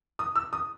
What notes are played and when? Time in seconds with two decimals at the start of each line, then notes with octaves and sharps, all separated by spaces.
0.19 D#6
0.36 E6
0.53 D#6